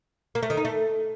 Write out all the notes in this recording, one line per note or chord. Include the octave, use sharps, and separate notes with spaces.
A#3
A3
D#3
D#4
A3